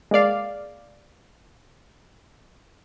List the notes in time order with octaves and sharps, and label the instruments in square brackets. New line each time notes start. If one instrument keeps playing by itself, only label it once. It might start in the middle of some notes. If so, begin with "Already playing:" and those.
[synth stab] G#3 A#3 D5 F5